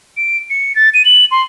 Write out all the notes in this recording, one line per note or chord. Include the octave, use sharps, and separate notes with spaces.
D7
C#7
A6
D#7
F#7
C6